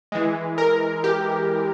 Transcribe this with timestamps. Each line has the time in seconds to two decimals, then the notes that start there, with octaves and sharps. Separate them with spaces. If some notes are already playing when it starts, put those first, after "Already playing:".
0.12 E3 G#3
0.58 A#4
1.04 G4